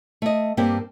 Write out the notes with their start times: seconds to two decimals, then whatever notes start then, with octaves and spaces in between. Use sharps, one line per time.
0.22 A3 D#5
0.57 G2 A#3 C4 G4